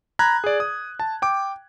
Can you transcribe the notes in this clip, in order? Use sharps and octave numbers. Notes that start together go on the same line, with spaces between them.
A#5 B5 F#6 G#6
G#4 D5
D#6
A5
G5 D6